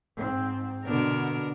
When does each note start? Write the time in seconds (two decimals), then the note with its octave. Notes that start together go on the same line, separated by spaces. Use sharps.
0.19 G#2 C4
0.85 B2 D3 B3 D4 A#4